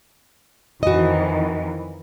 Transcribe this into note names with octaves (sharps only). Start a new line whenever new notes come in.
F2 D#3 E3 F#4 D#5